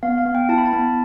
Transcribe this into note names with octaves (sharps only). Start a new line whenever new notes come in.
B3 F5
F5
B3
G5
E4 A5
B5
A5
B3